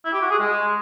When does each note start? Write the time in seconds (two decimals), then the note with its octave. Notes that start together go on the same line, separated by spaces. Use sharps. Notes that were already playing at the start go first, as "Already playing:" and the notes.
0.05 E4
0.13 G4
0.22 F#4
0.30 G#4
0.39 G#3